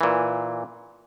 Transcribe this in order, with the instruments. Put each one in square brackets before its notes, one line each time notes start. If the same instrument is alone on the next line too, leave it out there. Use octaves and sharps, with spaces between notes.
[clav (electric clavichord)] A#2 E3